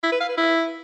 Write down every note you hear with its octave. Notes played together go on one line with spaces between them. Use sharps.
E4
B4
F5
B4
E4